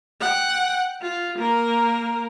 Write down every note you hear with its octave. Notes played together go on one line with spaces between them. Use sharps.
F#5 G5
F4
A#3 A#4